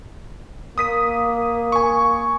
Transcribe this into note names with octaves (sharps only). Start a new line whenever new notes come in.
A#3 D#6 B6 D#7
G#5 C#6